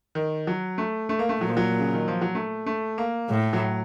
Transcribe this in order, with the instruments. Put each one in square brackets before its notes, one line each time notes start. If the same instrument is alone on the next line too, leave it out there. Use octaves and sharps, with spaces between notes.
[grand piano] D#3
F#3
A3
A3
A#3
A3
[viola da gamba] A#2 [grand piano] F#3
[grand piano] F3
F#3
C#3
D#3
F3
F#3
A3
A3
A#3
[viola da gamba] A2
[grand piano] F#3